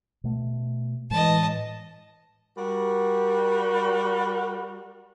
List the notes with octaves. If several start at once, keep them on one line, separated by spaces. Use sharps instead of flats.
B2 A3
A2 E3 G#3 D#5 A5
G3 F#4 A#4